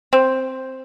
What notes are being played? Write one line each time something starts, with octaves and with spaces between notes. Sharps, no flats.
C4